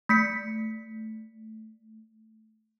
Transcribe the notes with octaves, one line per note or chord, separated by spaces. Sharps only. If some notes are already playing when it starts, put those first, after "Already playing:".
A3 B6 C#7